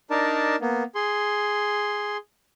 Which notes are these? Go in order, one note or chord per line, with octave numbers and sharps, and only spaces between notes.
D4 D#4 A#4 D5 A5
A#3 B3
G#4 C6